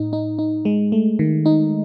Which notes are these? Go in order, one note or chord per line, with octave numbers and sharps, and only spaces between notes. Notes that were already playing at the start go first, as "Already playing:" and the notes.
Already playing: A2 D#4
D#4
D#4
G#3
A3
D#3
D#4